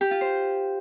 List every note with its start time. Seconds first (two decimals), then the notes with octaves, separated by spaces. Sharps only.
0.01 G4
0.11 F4
0.21 C5